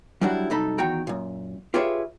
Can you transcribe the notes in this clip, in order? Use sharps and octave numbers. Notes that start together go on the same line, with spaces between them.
F#3 G3 D4 E4 F#4
C2 F#2 D#4 A4 B5
E2 D#3 F#4 G5 A#5
F#2 A#2
F4 G4 G#4 B4 C#5 E5